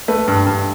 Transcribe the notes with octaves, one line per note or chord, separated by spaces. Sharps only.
A3 B4
G2
G2